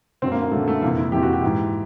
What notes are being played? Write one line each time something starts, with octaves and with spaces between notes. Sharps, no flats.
F#2 D3 C4
A#3
A#3
F#2 D3 A3
A3
F2 C3 E3 A#3
E4
F2 C3 E3 G4
F#4
G4
G#2 E3